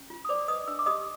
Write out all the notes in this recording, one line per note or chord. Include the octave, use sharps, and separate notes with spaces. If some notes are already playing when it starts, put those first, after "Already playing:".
Already playing: C#4
F4
D#6
C5 D5 D6
B4 D#5 D#6
D4 E5 E6
D6
G4 D#5 D#6